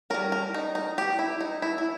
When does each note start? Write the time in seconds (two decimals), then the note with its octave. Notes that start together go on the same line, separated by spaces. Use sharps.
0.10 G3 C#4 A#4
0.32 A#4
0.54 D#4
0.75 D#4
0.98 G4
1.19 E4
1.41 D#4
1.62 E4
1.78 E4